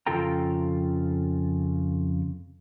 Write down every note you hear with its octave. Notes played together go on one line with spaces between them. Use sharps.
F2 C#3 F4 A4 G5 A#5